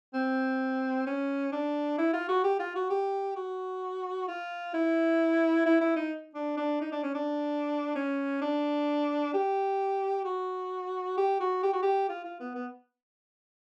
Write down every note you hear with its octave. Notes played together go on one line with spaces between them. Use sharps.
C4
C#4
D4
E4
F4
F#4
G4
F4
F#4
G4
F#4
F4
E4
E4
E4
D#4
D4
D4
D#4
D4
C#4
D4
C#4
D4
G4
F#4
G4
F#4
G4
F#4
G4
F4
F4
B3
B3